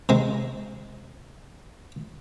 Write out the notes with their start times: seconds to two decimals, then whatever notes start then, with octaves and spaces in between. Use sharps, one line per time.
0.09 C3 G#3